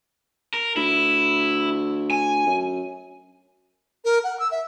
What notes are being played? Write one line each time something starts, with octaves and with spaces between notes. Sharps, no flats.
A#4
D2 E4
G#5
F#2
A#4
F#5
E6
E5